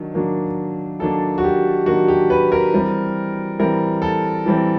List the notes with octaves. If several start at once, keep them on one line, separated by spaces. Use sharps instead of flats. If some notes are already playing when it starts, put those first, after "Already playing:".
Already playing: D#3 F#3 D4
D#3 F#3 A#3 D4
D#3 F#3 A#3 D4 A4
F#4
G4
D#3 F#3 A#3 D4 F#4
G4
B4
A#4
E3 G3 C4
E3 G3 C4 A#4
A4
E3 G3 C4